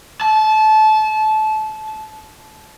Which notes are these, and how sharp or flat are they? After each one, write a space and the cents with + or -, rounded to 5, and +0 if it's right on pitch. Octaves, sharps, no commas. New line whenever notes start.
A5 -25